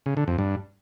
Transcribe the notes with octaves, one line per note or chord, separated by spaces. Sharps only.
C#3
D3
F2
G2